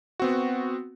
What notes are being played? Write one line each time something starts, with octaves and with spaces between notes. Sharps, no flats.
B3 C4 F#4